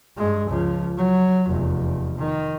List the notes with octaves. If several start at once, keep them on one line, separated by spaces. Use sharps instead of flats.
G2 G#3
C#2 F3
F#3
F1 E2
D#3